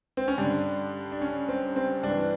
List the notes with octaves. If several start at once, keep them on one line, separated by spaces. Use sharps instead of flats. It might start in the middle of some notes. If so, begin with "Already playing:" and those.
C4
C#4
G2 D3 D4
D4
C#4
C4
C4
G2 E3 D4